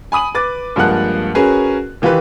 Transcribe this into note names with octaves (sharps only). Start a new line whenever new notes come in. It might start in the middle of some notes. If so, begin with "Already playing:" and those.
G#5 B5 D#6 D#7 F#7
B4 D6 A6
G2 F3 G#3 A#3 F#5 F#6
C#4 F#4 G#4 A#4 B4
D#3 E3 F4 G4 B4